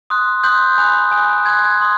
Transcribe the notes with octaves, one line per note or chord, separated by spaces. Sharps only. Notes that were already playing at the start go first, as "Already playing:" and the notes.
C6 D#6 F#6
C6 D#6 F#6 G6
G#5 B5 D#6 F#6
G#5 B5 D#6 F#6
G#5 C6 D#6 F#6 G#6
C6 D#6 F#6